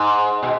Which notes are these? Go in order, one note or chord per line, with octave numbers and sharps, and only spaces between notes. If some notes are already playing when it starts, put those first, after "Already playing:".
Already playing: G#2
B2